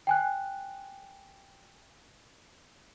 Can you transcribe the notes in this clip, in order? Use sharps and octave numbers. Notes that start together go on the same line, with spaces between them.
G5 G#5 F#6